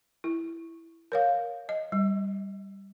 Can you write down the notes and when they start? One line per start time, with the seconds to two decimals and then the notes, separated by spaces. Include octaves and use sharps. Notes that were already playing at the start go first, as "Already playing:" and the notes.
0.24 E4
1.12 A#4 C#5 F5
1.69 D#5
1.92 G3